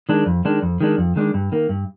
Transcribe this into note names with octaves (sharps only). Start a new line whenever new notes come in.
D#3 G#3 D4
F2
D#3 G#3 D4
F2
D#3 G#3 D4
F2
D#3 G#3 D4
G2
D#3 A#3
G2